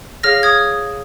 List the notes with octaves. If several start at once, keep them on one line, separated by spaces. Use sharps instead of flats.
G#4 C#5 F5 F6 A#6
D#6 G#6